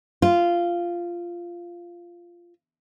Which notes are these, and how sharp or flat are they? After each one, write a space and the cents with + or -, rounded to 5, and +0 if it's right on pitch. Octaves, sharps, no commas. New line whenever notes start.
F4 -10